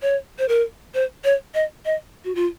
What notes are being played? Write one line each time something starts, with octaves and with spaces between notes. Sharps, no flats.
C#5
C5
A#4
C5
C#5
D#5
D#5
F#4
F4